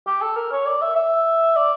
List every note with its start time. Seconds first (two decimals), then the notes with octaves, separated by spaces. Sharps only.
0.07 G4
0.22 A4
0.36 A#4
0.52 C#5
0.66 D5
0.81 E5
0.95 E5
1.56 D5